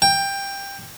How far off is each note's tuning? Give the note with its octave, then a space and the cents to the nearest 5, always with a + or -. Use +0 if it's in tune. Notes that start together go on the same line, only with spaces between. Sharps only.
G5 +15